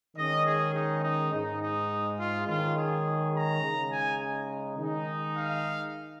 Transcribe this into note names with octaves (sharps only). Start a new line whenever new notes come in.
D#3 G#3 C#4 D#5
G#4
D#4
D#4
G#2 G#3 D#4
D#4
F4
D#3 G#3 C#4 F4
G#4
A#5
C#3 G#3 D#4
G#5
D#3 G#3 D#4
F5